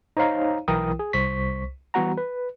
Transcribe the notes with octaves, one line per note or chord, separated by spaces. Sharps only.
D#4 C5 C#5 F5 A#5
B1 E3 E4 A#4 G5 D#6
G#4
C2 C5 C#6 B6
E3 G3 B3 F#4 F#5 A#5
B4